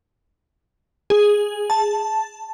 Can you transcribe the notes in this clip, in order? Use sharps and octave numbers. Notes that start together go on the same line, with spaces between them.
G#4
A5